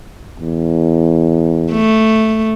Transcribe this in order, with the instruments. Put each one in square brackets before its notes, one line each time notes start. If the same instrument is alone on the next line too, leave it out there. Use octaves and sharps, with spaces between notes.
[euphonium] E2
[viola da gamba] A3